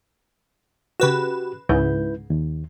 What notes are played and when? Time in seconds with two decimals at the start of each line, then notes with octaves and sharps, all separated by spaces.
1.00 C#3 F#4 G4 B4 E7
1.69 C#2 G#2 C#3 E4 B4 G6
2.30 D#2